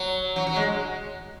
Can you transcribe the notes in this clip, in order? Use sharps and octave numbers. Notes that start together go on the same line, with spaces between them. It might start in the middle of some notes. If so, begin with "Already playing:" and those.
Already playing: F#3
F#3
F#3
G#3